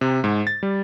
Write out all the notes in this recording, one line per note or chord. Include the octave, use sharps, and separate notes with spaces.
C3
G#2
A6
G3